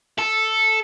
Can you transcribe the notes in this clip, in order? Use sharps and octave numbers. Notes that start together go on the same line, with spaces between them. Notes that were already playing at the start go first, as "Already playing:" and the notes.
A4